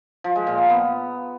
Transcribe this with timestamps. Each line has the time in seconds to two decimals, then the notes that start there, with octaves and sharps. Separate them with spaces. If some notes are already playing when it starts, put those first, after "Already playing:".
0.24 F3
0.36 G#3
0.47 A#2
0.58 A#3
0.69 B3